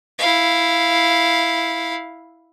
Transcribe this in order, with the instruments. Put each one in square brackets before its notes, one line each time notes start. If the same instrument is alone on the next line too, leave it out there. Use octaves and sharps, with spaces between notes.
[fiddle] E4 F5